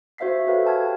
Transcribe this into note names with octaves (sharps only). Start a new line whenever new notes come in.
F#4 C5 E5 F5 B6 C7
F#4 G4 A4 B4 C#5 F5
G5 A5 F6 G#6